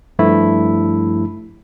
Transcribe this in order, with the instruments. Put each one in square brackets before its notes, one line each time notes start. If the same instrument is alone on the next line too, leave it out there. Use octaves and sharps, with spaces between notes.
[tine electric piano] G2 F3 A3 E4